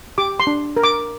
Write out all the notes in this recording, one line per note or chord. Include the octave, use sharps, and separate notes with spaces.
G4 D6
C6
D4
A#4
D6